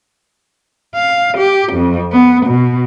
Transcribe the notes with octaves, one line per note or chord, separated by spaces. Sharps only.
F5
G4
F2
B3
B2